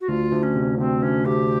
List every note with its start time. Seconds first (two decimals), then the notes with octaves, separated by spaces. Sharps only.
0.01 F#4
0.08 D2 F4
0.32 D2
0.43 C#4
0.55 C3
0.78 D2 C4
1.02 D2 C#4
1.25 D2 G4